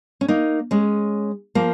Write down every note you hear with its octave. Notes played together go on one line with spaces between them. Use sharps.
C#4
A#3 D#4
G#3 C#4
F3 A#3